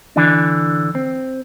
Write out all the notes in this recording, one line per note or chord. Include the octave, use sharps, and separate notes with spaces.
D3 E3 D4
C4